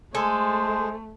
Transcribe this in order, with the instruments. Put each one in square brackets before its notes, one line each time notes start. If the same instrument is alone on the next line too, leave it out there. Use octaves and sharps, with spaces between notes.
[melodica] G#3 [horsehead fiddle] A3 [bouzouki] A4 G#5 [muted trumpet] C5